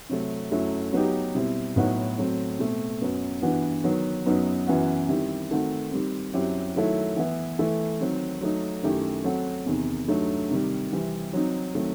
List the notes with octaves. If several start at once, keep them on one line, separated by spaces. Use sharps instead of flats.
C3 F#3 A3 C4
F#2 F#3 A3 E4
F#3 B3 D#4 G4
B2 G3 C4 E4
A2 F#3 B3 D#4 F#4
F#3 A3 C4
B2 A3 C4
F#2 F#3 B3
G2 E3 B3 F#4
D#3 F#3 B3
F#2 F#3 B3 D#4
F#2 E3 B3 F#4
D#3 G3 C4 E4 G4
D#3 A3 C4 F#4 A4
D#3 G3 C4
F#2 F#3 C4 E4 G4
D#3 F#3 A3 E4 A4
E3 B3 E4
E3 A3 E4 A4
D#3 F#3 C4
F#3 A3 D#4
F#2 D#3 A3 E4 G4
F#3 C4 F#4 A4
E2 C3 D#3
G2 F#3 A3 D#4
C3 D#3 G3
C3 E3 G3 C4
F#3 C4 D#4
D#3 F#3 A3 C4